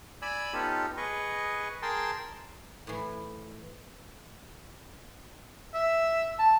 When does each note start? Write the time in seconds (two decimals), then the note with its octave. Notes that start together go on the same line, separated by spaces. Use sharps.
0.22 D5 G#5 B5 E6
0.53 B3 C#4 D#4 F4 G4 A4
0.97 G#4 B4 D#5 C#6
1.82 G#4 A#4 G5 A5 C6
2.87 A2 E3
5.74 E5
6.39 A5